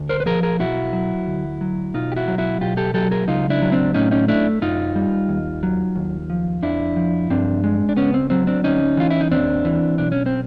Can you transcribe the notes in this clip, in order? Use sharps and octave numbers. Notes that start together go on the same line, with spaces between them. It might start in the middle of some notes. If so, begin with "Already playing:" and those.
Already playing: D2
A#4 C5
B4
F3 G#4 A#4
G#4 A#4
B1 E4 F#4
F#3
D2
F#3
B1 D#4 F4
G4
E4 F#4
F#3
E4 F#4
B1 F4 G4
G4 A4
F#3 G4 A4
G#4 A#4
C#2 D#4 F4
D4 E4
F#3
C4 D4
A2 C#4 D#4
C#4 D#4
A3 D4 E4
F#2 D#4 F4
G3
D#2
F#3
D#2
F3
F2 D4 E4
F3
G2 C4 D4
G#3
D4
C#2 B3 C#4
C4
F#3 C4
C4 D4
D2 C#4 D#4
E3 F4
E4
D#4
D#2 C4 D4
E3
B1 D4
C#4
C4